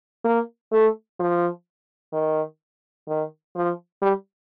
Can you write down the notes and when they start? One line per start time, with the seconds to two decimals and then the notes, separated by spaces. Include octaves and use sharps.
0.25 A#3
0.72 A3
1.19 F3
2.13 D#3
3.08 D#3
3.55 F3
4.02 G3